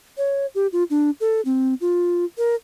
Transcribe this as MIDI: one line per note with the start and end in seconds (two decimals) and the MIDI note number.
0.18 0.46 73
0.55 0.67 67
0.72 0.84 65
0.90 1.10 62
1.21 1.41 69
1.45 1.74 60
1.81 2.25 65
2.38 2.55 70